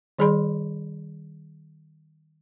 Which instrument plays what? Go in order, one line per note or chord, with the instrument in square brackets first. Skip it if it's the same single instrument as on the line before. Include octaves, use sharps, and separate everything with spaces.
[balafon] D#3 G3 G#4 D5 B5 C6